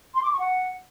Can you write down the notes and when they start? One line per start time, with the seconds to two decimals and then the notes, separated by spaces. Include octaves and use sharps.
0.15 C6
0.23 D6
0.31 C#6
0.40 F#5